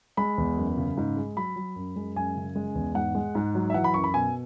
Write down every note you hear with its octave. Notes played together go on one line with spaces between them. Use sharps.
G#3 B5
E2
F#2
C#3
G#2
G#3
F#3 B5
F#3
F#2
G#3
F#2 G#5
C#3
G#3
E2
G#2 F#5
G#3
G#2
F#3
E5
E3 F#5
B5
F#2 C#6
B5
B2 G#5